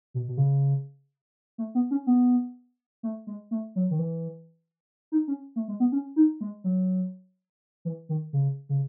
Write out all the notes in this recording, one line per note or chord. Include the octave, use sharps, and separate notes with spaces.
B2
B2
C#3
A3
B3
C#4
B3
A3
G#3
A3
F#3
D#3
E3
D#4
C#4
A3
G#3
B3
C#4
D#4
G#3
F#3
E3
D#3
C#3
C#3